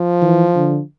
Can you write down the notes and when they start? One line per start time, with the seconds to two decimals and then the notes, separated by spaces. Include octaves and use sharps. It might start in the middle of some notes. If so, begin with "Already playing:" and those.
Already playing: F3
0.22 E3
0.55 D3